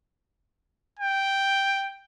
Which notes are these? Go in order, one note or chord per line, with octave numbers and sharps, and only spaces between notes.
G5